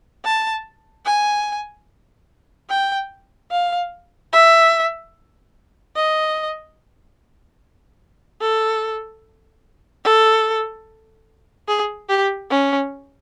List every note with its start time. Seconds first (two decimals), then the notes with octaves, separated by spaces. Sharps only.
0.25 A5
1.06 G#5
2.69 G5
3.51 F5
4.33 E5
5.96 D#5
8.41 A4
10.04 A4
11.68 G#4
12.09 G4
12.50 C#4